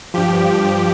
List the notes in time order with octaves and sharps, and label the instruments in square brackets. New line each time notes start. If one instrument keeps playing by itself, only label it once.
[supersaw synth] G2 F3 G4